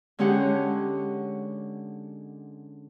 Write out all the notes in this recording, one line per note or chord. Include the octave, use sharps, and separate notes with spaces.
D3 G#3 C#4 G4 G#4 F#5